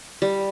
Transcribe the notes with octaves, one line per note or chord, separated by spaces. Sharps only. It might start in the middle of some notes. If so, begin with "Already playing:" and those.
G3